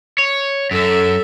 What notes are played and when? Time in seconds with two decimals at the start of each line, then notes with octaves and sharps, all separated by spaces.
0.18 C#5
0.71 F#2 A4 E5